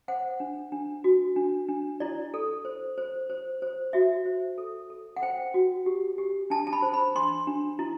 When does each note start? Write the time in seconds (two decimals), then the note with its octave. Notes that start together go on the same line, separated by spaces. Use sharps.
0.08 C5 F#5
0.40 D4
0.72 D4
1.04 F#4
1.36 D4
1.69 D4
2.00 E4 D5
2.34 A4
2.65 C5
2.98 C5
3.30 C5
3.62 C5
3.93 F#4 E5
4.26 C5
4.58 A4
4.90 A4
5.16 F#5
5.22 C5 G5
5.54 F#4
5.86 G4
6.18 G4
6.50 D4 A5
6.67 A5
6.73 B5
6.82 C5
6.94 B5
7.15 D4 C6
7.47 D4
7.79 E4